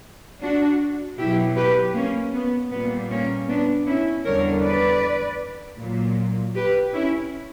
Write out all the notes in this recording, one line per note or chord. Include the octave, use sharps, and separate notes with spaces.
D4 F#4
B2 F#3 E4 G4
G4 B4
A#3 C#4
B3
A#2 G3 B3
A#3 C#4
B3 D4
C#4 E4
E2 D3 G3 A#4 C#5
B4 D5
A#2 F#3
G4 B4
C#4 E4